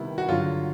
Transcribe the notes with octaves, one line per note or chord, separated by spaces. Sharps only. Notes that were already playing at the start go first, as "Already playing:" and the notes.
Already playing: C3 D#3 G3 B3 E4
F#4
G2 D3 F#3 F4